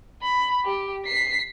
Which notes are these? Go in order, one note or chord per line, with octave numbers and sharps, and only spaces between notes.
B5
G4
B6 C7